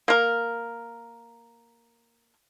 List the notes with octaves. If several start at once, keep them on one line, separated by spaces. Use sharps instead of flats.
A#3 A#4